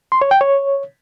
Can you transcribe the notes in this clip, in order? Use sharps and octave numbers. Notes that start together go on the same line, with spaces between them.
C6
C#5
G5
C#5